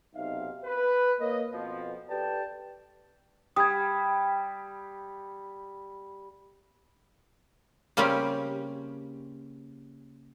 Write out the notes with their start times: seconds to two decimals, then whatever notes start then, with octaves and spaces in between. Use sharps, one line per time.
0.15 B1 C3 D#4 E5 F5
0.64 B4
1.20 A#3 A#4 B4 C#5 D#5
1.53 F2 B2 F3
2.09 G4 A4 B4 D5 G5 A5
3.56 G3 D#6 G#6
7.97 C#3 G3 A#3 C4 C#4 G4